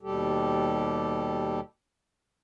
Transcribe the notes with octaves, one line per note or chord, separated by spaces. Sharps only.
D#2 B2 G3 G4 A4